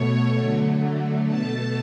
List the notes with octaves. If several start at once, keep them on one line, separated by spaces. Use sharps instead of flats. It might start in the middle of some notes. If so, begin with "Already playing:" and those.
Already playing: B2 A3 C#5
D3 F#3 A3
B2 A3 A5